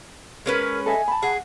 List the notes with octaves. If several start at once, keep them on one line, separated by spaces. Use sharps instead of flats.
G#3 C#4 A#4 B4
A4 D#5 E5 G#5
A5 B5
G#4 F#5